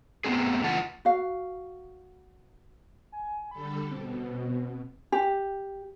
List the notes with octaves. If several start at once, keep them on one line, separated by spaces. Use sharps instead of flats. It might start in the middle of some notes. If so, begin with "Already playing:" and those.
A3 B3 C4 G#4
F#2 C#3 E3 F4 F#5 A5
F#4 F5
G#5
D3 G3 A4 B5
B2 C4
G4